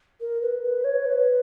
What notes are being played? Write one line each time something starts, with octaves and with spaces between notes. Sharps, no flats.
A#4
B4
B4
C#5
B4